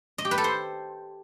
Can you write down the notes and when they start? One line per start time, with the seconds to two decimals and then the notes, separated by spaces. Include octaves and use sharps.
0.18 D#5
0.25 G4
0.31 B4
0.38 A4
0.44 C5